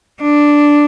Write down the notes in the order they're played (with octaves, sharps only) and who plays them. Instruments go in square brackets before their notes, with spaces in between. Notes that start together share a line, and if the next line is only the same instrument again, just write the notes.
[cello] D4